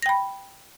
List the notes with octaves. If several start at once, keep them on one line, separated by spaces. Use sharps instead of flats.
G5 B5 A#6